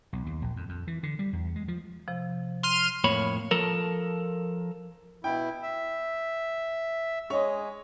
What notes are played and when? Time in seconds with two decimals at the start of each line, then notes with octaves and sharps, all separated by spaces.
0.13 B1
0.26 D#2
0.42 A#1
0.56 F2
0.69 F2
0.87 E3
1.03 D3
1.19 G3
1.33 E2
1.56 G#3
1.68 F3
2.08 C3 F3
2.63 C6 F6 D#7
3.04 F2 A2 A#3 C#5 B5
3.51 F3 A4 A#4
5.24 B2 E4 G5
5.63 E5
7.30 G#3 C#5 D#5